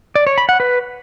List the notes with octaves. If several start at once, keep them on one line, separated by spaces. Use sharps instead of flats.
D5
C#5
B5
F#5
B4